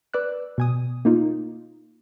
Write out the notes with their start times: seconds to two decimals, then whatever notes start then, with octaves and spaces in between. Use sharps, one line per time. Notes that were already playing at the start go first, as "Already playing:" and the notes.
0.14 B4 D5 E6 F#6
0.58 B2 G#5 D#6
1.05 A#3 D#4 F4